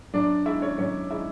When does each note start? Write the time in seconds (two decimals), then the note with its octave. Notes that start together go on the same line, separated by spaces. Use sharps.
0.14 F#2 D4 D5
0.45 D#3 G#3 E4 E5
0.62 C#4 C#5
0.78 F#2 C#4 C#5
1.10 D#3 G#3 E4 E5